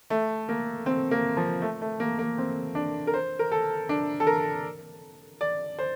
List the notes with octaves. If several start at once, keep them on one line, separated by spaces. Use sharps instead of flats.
A3
A#3
C4
A#3
F3
A3
A3
A#3
A#3
C4
D4
A#4
C5
A#4
A4
D4
A4
A#4
D5
C5